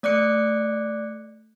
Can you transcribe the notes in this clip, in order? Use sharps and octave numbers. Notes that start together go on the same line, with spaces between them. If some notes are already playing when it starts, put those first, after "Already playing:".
A3 D5 D6 F#6 C#7